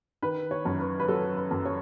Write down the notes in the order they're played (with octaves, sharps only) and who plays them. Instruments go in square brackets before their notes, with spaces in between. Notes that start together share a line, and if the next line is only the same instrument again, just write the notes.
[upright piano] D#3 B4
C#5
F#2
B4
B4
F#3 A4
B4
F#2
C#5